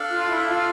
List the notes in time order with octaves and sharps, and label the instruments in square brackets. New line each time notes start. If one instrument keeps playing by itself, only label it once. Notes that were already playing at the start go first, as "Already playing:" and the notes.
Already playing: [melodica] D4 A4 D5 F5
[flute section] F4
E4
F4